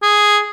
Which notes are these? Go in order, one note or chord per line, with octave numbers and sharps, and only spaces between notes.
G#4